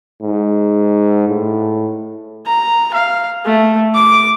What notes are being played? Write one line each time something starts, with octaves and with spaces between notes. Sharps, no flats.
G#2
A2
A#5
F5
A3
D6